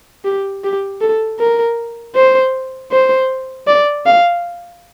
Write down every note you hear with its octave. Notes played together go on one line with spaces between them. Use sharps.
G4
G4
A4
A#4
C5
C5
D5
F5